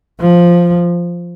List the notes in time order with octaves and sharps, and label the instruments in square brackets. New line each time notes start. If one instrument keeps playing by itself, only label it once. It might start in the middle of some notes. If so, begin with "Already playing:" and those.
[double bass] F3